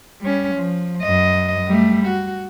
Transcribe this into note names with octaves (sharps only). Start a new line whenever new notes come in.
G3 C#4
F3
F#2 D#5
G3 A3
F#4